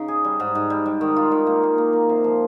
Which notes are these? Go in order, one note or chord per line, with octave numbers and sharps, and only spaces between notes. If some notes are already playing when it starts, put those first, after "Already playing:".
Already playing: C#3 D#4
G#4
G3
G#2
G#2
G3
G3
D#3
F4
D#3
A#3
A#3
A#3
A#3
C3
F3